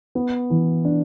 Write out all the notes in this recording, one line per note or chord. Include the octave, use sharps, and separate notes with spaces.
B3
E3
D4